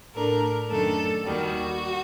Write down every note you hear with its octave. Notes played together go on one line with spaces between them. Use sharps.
A2 A3 D4 A#4
F#2 D#3 A3 D4 A4
D#2 D#3 G3 F#4